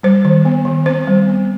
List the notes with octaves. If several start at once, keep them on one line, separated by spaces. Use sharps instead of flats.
G3 C5
D#3
B3
D#3
C4 C5
G3
B3